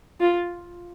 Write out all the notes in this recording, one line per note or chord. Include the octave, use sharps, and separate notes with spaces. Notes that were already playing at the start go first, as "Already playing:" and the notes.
F4